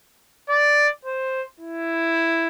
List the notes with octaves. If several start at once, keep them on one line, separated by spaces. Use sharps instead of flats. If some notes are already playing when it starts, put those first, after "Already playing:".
D5
C5
E4